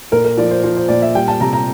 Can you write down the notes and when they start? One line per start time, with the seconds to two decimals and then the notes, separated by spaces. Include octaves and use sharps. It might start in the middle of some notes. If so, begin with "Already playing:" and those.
0.12 A#2 A#4
0.25 A#4
0.37 F3 D5
0.51 C5
0.63 F3 C5
0.77 C5
0.88 A#2 D5
1.02 E5
1.15 G3 G5
1.28 A5
1.40 C3 A#5
1.53 A#5